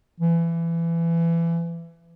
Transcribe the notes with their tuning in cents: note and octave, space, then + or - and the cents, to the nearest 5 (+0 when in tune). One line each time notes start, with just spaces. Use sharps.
E3 +25